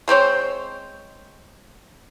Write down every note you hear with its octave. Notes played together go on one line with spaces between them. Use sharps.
G#3 C4 C5 C#5